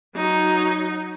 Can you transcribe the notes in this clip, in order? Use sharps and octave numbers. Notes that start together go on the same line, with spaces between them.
F#3 D#4